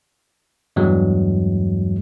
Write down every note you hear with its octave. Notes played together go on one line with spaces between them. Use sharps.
E2 G2 E3 F#3 G#3